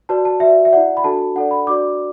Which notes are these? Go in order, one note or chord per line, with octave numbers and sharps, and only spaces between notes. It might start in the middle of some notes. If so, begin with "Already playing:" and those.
F#4 B4 D5 A5
A5
F#4 B4 D5 E5
E5
E4 D5 F#5
B5
D4 F#4 A4 A5
D4 A4 D5 F#5
B5
D4 F#4 D5 D6